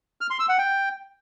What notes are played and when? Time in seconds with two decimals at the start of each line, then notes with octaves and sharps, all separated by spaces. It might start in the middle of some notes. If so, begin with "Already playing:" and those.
0.21 F6
0.30 C6
0.40 E6
0.49 F#5
0.58 G5